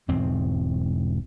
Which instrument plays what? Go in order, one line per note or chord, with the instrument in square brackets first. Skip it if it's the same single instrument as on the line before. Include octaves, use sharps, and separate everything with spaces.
[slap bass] E1 E2 G#2 C4